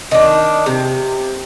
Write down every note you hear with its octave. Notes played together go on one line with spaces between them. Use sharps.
D#3 D4
C3